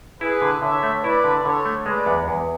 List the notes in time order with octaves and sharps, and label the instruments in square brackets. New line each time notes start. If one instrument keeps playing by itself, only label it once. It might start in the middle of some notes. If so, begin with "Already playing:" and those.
[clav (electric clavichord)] E4 [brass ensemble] G#4 B4
[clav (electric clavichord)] D3
[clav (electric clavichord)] D3 [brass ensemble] C#5 E5
[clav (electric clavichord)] A3
[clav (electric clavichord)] E4 [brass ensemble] B4 D5
[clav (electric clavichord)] D3
[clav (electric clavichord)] D3 [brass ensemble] A4 C#5
[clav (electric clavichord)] A3
[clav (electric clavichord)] G#3 [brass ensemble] B4 D5
[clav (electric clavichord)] E2
E2